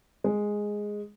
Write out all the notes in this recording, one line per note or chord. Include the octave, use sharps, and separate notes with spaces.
G#3